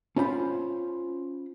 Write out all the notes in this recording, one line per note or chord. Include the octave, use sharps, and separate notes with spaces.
C#4 F4 C5 A#5 B5